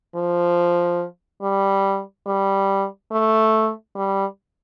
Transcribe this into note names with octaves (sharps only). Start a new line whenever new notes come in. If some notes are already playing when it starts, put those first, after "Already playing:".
F3
G3
G3
A3
G3